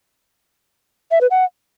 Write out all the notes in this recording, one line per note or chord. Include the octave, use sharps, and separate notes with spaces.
E5
B4
F#5